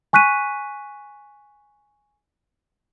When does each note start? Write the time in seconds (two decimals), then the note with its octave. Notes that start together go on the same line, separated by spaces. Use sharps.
0.13 G#5 C#6 F#6 B6 D#7